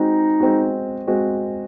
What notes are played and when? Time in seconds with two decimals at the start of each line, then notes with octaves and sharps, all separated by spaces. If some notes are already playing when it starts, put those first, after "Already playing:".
Already playing: G#3 C4 D#4 F#4
0.40 G#3 C4 F#4
1.07 G#3 C4 F#4